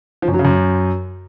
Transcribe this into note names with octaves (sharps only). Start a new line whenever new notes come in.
F3
F#2
F#3
C#3
F#2